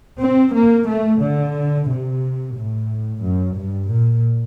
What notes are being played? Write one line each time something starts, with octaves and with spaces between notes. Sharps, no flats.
C4
A#3
A3
D3
C3
A2
F#2
G2
A#2